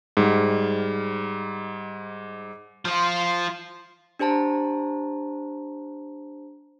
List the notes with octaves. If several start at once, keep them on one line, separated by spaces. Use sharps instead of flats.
G#2 G3
F3 F4
D4 G4 C5 A5 A#5